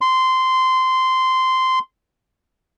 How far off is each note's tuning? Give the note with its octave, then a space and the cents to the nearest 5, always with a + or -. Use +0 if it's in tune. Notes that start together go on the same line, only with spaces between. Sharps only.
C6 -15